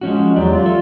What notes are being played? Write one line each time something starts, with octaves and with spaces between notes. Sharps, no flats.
F3 G#3 C#4 F#4
E2 F#3 G4 D5
F4
A4 E5